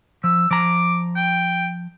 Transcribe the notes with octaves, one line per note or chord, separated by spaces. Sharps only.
F3 E6
F3 A#5 D6
G5